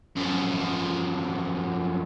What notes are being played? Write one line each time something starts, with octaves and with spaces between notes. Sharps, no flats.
F#2 F3